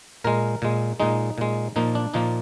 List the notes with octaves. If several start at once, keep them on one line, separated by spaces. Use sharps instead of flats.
A#2 G#3 A#4
A#2 G#3
A#2 G#3 D#4
A#2 G#3
A#2 F3 A#3 D#4
D4
A#2 F3 A#3 D#4